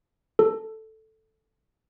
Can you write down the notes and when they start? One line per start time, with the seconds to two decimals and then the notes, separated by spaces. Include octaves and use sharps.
0.39 A4